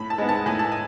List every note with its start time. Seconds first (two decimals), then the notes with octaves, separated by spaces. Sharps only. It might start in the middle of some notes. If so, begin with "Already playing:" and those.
Already playing: A2 B5
0.10 A5
0.18 G#3 B3
0.29 A5
0.46 A2 G#5
0.59 A5
0.72 G#5